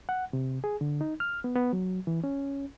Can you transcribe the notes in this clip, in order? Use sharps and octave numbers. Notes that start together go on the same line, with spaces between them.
F#5
C3
G#4
D3
D#4
F6
B3
B3
F#3
E3
C#4